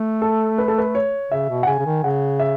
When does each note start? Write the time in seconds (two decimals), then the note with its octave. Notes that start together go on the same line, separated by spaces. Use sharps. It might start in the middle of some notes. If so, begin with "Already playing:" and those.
Already playing: A3
0.22 A4
0.58 B4
0.68 A4
0.78 B4
0.95 C#5
1.31 C#3 E5
1.49 B2
1.63 F#5
1.67 C#3 G#5
1.79 C#3
1.86 D#3
2.03 C#3 F#5
2.40 E5